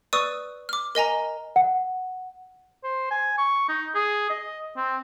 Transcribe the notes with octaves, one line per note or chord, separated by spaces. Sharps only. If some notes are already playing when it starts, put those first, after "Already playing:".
B4 D5 C#6 D#6 E6 D#7
D6 F6
A#4 D#5 G#5 A#5
F#5
C5
G#5
C#6
D#4
G#4
D#5
C4